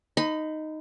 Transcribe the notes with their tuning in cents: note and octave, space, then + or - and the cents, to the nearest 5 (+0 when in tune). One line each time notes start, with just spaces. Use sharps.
D#4 +0 B5 +35